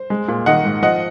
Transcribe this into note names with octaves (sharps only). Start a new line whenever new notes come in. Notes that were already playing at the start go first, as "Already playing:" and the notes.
Already playing: C5
G#3
A#2
D#3 D#5 F#5
G#2
F3 D#5 F#5